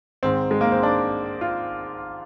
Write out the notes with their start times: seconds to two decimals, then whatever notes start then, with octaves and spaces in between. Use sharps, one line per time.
0.23 G#2 D#3 C4
0.51 G#3
0.61 A#3
0.72 C4
0.83 D4
1.41 F4